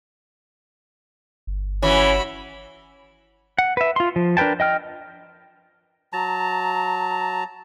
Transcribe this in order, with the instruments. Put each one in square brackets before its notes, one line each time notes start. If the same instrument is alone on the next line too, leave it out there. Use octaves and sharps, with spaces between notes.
[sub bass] G1
[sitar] E3 [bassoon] C#4 [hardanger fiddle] F#4 B5
[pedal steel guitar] F#5
B4 E5
F4 C6
F3
D4 A#4 B4 G5 A5
D#5 G5 F6
[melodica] F#3 A5 A#5